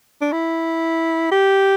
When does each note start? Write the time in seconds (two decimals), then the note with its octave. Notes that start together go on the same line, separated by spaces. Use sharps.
0.21 D4
0.32 E4
1.31 G4